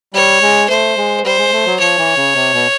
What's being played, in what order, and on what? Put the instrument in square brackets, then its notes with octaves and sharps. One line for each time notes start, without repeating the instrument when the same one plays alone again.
[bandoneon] G3 [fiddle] C#5
[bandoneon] G#3
[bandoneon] A3 [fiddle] C5
[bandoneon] G#3
[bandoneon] G3 [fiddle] C5
[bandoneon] G#3
A3
F#3
[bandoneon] F3 [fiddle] C#5
[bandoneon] E3
C#3
C3
B2